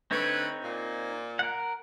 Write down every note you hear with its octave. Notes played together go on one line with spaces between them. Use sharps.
D3 A3 C4 D#4 B4 C#5
A#2
A#4 F#5